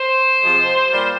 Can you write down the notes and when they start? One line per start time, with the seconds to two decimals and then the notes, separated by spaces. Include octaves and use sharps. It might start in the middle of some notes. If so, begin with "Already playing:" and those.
Already playing: C5
0.42 C3 F3 G#3
0.91 A#2 G3 A#3